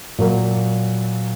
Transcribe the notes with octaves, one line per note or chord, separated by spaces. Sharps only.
A#2 F#3 A#3